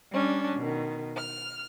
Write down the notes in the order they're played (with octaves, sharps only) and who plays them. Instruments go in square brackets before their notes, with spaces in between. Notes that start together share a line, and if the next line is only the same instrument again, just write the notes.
[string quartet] G3 C#4 D4
B2 D#3
F6